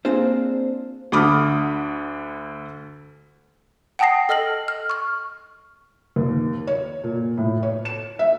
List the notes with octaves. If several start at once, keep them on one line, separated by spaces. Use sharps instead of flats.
A#3 C4 D4 F4 G#4 C5
D2 D3 B5 D6 D#6 F6
F#5 G5 A5 D#6 A#6 C7
A4 D#5 F6 A#6 F#7
F6
C#6 F6
D#2
C#5
A#2
A2
C#5
E7
E5